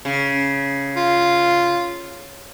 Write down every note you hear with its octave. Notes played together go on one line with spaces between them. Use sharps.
C#3
F4